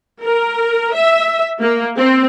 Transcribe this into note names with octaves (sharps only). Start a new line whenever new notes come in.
A#4
E5
A#3
C4